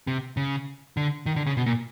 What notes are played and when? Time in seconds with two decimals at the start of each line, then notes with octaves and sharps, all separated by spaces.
0.07 C3
0.37 C#3
0.97 D3
1.26 D#3
1.36 D3
1.46 C#3
1.57 B2
1.66 A#2